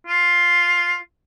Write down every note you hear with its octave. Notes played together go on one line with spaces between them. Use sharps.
F4